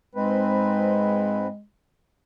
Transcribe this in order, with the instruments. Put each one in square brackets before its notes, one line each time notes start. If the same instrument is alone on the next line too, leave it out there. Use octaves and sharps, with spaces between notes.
[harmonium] G#2 C4 B4 [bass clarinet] G#3